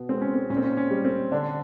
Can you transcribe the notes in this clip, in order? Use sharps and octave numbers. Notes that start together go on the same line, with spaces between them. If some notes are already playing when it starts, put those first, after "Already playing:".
Already playing: B2 B3
G#3 C4
C#4
C4
A#2 C#4
C4
C#4
C#4
G3
C4
D3 D4